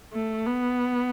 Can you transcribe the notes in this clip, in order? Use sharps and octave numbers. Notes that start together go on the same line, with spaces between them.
A3
B3